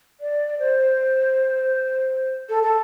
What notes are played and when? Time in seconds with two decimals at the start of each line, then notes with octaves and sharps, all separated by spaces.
0.21 D5
0.59 C5
2.49 A4
2.63 A4